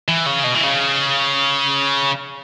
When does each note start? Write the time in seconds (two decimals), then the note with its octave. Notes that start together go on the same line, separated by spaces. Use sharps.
0.08 E3
0.26 C#3
0.44 B2
0.54 E3
0.63 C#3